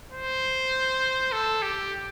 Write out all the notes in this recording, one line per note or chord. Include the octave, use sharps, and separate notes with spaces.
C5
A4
G4